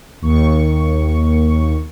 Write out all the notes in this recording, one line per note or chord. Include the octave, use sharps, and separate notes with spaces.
D#2 C#6